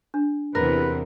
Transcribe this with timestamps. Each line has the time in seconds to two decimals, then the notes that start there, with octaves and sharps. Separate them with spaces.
0.14 D4
0.55 E2 C3 A#4 B4